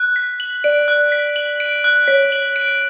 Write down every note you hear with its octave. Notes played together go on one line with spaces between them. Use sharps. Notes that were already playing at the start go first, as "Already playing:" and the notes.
Already playing: F#6
B6
F#7
D5 D7
F#6
B6
F#7
D7
F#6
C#5 B6
F#7
D7